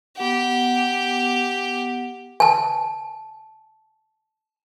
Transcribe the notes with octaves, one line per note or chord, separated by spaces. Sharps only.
B3 G4 F#5
G#5 A5